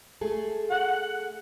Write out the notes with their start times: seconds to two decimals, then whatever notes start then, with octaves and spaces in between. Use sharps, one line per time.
0.21 A3 G#4 A4
0.71 F#5